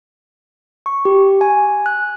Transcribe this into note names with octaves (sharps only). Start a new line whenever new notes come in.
C#6
G4
G#5
F#6